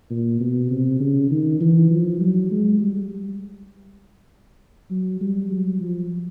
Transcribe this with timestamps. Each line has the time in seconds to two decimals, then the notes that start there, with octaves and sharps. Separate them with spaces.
0.10 A#2
0.40 B2
0.70 C3
1.00 C#3
1.31 D#3
1.61 E3
1.91 F3
2.21 F#3
2.51 G#3
2.80 G3
4.90 F#3
5.21 G3
5.51 F#3
5.81 F3